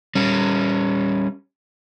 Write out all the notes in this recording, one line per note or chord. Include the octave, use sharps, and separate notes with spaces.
G3 C#4